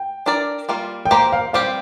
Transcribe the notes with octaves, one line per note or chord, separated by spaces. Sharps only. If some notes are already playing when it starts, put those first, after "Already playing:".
Already playing: G5
D4 A#4 D5
G3 A#3 F4
G5
A#3 G4 C5 A#5
F5
G3 C4 G4 F5